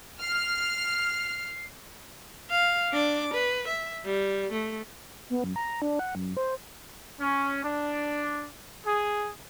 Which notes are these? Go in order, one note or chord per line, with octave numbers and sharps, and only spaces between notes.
F6 C7
F5
D4 D6
B4
E5
G3
A3
B3
F#2
A#5
D4
F#5
F#2
C5
C#4
D4
G#4